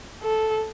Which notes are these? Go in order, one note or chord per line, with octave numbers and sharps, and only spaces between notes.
A4